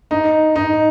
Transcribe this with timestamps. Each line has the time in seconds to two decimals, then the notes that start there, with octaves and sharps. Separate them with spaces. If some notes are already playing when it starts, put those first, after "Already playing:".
0.11 D#4
0.56 D#4